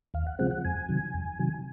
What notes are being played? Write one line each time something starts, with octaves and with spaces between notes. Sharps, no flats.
D#2 F5
F#5
C#3 F3 G#3 C4 F#5
F#5
F2 G#5
C3 D#3 F#3
F2
C3 D#3 F#3